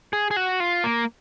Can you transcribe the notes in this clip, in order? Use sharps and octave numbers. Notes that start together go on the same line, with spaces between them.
G#4
G#4
F#4
F4
A#3